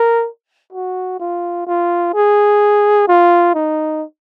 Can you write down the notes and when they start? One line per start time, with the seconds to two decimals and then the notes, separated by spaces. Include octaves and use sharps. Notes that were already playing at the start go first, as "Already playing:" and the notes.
Already playing: A#4
0.73 F#4
1.20 F4
1.67 F4
2.14 G#4
3.08 F4
3.55 D#4